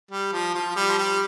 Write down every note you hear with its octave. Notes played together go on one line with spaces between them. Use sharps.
G3
F3
F3
G3
F3
G3